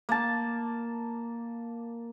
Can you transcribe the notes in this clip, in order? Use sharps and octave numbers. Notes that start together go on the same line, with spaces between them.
A#3 A5